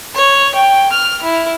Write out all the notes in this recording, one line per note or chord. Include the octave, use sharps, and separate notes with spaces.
C#5
G5
F6
E4